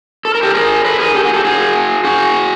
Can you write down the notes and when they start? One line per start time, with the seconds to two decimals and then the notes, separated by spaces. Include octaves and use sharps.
0.25 A4
0.35 A#4
0.43 G4 A4
0.54 G#4 A#4
0.85 A4 B4
0.99 G#4 A#4
1.15 G4 A4
1.24 F#4 G#4
1.34 G4 A4
1.45 F#4 G#4
2.04 F#4 G#4